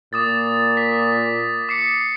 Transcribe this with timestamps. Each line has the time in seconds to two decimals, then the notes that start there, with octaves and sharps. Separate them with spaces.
0.13 A#2 D6 D#6 A6
0.77 B6
1.69 D6 C7 C#7